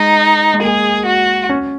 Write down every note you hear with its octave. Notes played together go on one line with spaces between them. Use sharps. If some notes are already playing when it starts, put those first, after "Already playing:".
Already playing: G#3 D#4
G#3
A#3 G#4
F#4
C#4